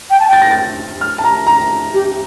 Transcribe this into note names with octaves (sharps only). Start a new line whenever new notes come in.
G5
A5
G5 A6
A#6
A6
F6
A5
A#5
A#5
G4